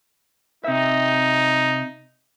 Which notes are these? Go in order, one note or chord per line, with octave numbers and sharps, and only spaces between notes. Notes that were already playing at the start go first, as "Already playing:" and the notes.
C3 D#4 E5